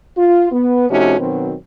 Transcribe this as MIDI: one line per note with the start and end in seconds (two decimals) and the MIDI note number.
0.18 0.50 65
0.52 0.88 59
0.90 1.17 48
0.90 1.17 53
0.90 1.17 57
0.90 1.17 61
0.90 1.17 63
0.90 1.17 66
1.19 1.54 47
1.19 1.54 51
1.19 1.54 54
1.19 1.54 60